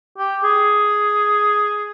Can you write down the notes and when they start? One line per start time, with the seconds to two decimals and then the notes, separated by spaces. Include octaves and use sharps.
0.18 G4
0.43 G#4